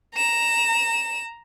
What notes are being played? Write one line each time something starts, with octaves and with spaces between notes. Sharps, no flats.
A#5 E7